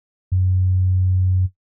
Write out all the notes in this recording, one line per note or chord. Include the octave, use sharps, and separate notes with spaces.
F#2